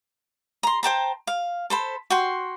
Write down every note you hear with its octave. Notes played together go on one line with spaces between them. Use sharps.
A#5 C6
C5 G5 A5 A#5
F5
A4 C5 B5
F#4 G5 C6